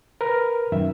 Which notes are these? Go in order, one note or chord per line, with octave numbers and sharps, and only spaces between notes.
A#4 B4 F6
F#2 D#3 E5